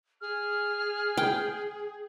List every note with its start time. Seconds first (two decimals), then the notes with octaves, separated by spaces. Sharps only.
0.21 G#4 F6
1.17 G5